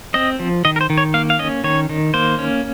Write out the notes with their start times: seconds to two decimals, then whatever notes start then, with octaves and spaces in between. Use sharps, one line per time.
0.14 C4 D#5
0.40 F3
0.65 D#3 D#5
0.76 A#4
0.81 C5
0.90 D#3
0.98 C#5
1.14 A#3 F5
1.30 F5
1.39 C#4 D#5
1.64 D#3 C#5
1.89 D#3
2.14 A#3 C5
2.39 C#4